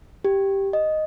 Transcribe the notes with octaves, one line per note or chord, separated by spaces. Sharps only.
G4
D#5